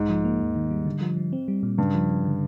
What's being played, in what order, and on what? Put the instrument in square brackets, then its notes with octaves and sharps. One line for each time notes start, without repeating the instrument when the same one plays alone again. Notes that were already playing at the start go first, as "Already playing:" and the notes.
Already playing: [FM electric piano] B1 [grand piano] G#2
[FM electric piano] F3
A#3
D#2
D#3
G3
D3
F3
F3
C4
G3
A#2
[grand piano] G2 [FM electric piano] C#3
[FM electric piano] F3
C#3
D3